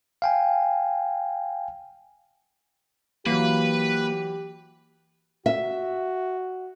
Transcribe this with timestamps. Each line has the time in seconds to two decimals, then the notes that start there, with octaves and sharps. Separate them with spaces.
0.22 F5 G5 G#5
3.26 E3 F#3 A#3 G4 B4
5.46 F#4 E5